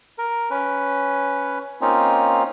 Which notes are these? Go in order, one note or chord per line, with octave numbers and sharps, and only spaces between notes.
A#4
C#4 B4
A#3 C4 C#4 D#4 F4